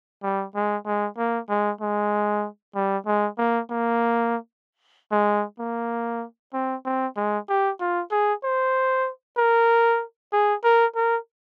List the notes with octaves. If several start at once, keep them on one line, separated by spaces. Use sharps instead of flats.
G3
G#3
G#3
A#3
G#3
G#3
G3
G#3
A#3
A#3
G#3
A#3
C4
C4
G#3
G4
F4
G#4
C5
A#4
G#4
A#4
A#4